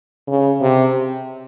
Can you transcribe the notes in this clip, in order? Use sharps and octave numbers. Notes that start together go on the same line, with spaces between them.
C#3
C3